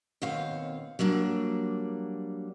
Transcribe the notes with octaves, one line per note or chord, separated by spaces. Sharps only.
D#2 B2 C4 C#5 F5
F#3 G3 A#3 D4